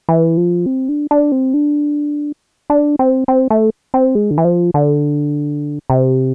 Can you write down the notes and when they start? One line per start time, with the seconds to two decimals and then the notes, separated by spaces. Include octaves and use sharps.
0.09 E3
0.37 F3
0.66 C4
0.89 D4
1.11 D4
1.32 C4
1.54 D4
2.70 D4
2.99 C4
3.28 C4
3.50 A3
3.94 C4
4.15 G#3
4.31 D3
4.38 E3
4.45 F3
4.74 D3
5.90 C3